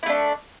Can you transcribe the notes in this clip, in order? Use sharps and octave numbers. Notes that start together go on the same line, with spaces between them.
A3 D4 E4